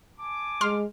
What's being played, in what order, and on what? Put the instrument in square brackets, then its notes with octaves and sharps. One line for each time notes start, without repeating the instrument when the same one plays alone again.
[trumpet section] G#5 A5 D6
[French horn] G#3 [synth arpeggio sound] C6 F6